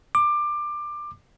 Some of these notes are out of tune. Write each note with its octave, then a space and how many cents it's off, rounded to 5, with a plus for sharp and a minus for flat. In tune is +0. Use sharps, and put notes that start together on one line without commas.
D6 +20